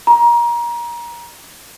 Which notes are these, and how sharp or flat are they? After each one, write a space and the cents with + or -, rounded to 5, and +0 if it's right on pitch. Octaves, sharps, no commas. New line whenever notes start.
A#5 +25